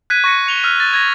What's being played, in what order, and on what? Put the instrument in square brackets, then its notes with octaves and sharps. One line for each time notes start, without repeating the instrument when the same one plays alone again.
[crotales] F#6 G#6 B6 D#7
C#6 A#6 C#7
C#7 F7 G7
E6 F6 B6
A6
G#6 A#6